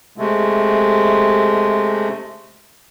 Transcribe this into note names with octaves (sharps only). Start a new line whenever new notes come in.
C3 G#3 A3